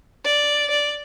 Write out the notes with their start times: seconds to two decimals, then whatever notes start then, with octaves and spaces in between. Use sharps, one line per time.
0.25 D5
0.70 D5